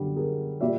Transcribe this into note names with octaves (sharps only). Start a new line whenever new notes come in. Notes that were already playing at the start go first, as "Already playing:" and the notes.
Already playing: F#2 D3 G3
G#4 A#4
A#2 G3 D5 E5